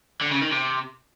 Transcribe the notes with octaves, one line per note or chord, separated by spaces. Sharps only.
D3
C#3
D#3
C3